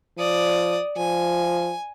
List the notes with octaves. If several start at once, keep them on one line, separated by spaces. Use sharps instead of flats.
F3 D5 D#6
F3 G#5